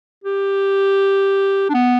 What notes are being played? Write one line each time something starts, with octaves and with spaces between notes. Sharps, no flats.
G4
D4
B3